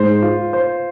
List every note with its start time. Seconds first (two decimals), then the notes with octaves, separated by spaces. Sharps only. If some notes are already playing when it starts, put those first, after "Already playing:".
Already playing: G#2 C5
0.23 F4
0.53 C5